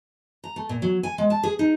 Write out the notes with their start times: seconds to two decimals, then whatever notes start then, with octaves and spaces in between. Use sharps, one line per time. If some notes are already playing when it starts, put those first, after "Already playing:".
0.44 A#5
0.56 A3
0.69 A#2
0.82 F#3
1.03 G#5
1.18 G#3
1.30 A5
1.43 G#4
1.59 D#4